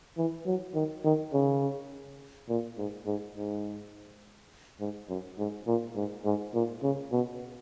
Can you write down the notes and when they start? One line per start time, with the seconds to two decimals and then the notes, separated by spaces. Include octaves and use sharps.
0.17 E3
0.46 F#3
0.75 D#3
1.04 D#3
1.33 C#3
2.49 A#2
2.78 G#2
3.07 G#2
3.36 G#2
4.80 G#2
5.09 F#2
5.39 G#2
5.67 A#2
5.96 G#2
6.25 G#2
6.54 A#2
6.83 C#3
7.12 B2